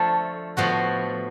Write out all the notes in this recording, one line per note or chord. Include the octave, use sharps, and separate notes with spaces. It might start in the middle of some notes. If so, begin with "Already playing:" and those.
Already playing: F3 A3 D4 F4 A4
A2 F3 B3 F#4